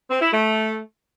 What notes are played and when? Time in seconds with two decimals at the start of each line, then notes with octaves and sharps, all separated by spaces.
0.10 C4
0.21 E4
0.33 A3